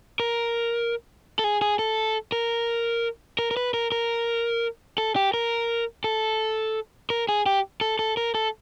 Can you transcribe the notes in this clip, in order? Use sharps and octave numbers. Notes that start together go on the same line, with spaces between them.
A#4
A4
G#4
G#4
A4
A#4
A#4
A#4
B4
A#4
A#4
A4
G4
A#4
A4
A#4
G#4
G4
A4
A4
A#4
A4